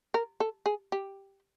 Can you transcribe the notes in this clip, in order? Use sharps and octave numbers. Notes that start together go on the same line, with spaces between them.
A#4
A4
G#4
G4